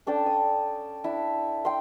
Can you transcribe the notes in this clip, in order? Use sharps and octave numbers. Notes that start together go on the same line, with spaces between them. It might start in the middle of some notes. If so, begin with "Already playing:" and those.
C#4 D4 A4 G5
D#6
D4 E4
G5 C6